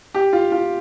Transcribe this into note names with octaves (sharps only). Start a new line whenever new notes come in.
G4
F4
F4